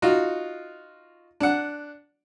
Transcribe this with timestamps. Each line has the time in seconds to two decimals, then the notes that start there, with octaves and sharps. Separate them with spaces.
0.02 D#4 F4 F#4
1.40 D4 F#5